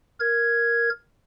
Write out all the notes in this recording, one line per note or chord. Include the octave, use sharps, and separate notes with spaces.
A#4 G#6